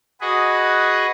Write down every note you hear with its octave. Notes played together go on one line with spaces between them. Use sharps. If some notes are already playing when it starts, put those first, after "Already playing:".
F#4 G#4 B4 D#5